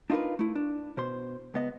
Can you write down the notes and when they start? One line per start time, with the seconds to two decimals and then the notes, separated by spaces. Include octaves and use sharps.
0.10 D4 D#4 F4 G4 A#4 B4
0.39 A3 E4
0.55 D4
0.97 B2 C5 C6
1.54 C#2 B3 D#5